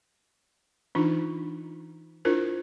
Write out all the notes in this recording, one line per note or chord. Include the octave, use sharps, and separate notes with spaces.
E3 D4 D#4 F4
D4 E4 F4 A#4 C5